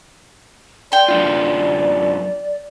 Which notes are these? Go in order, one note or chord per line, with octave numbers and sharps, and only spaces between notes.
D5 G5 C6
F#2 D4 F4